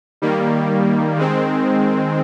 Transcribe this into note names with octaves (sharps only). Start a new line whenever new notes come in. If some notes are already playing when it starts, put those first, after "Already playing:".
D#3 G3 A#3
D#3 G#3 C4